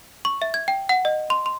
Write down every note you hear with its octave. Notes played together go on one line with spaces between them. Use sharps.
C#6
E5
G#6
G5
F#5
D#5
C6
C6